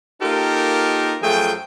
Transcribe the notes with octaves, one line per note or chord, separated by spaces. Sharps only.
A#3 D#4 F4 G4 A4 A#4
F#2 F3 A3 G#4 G5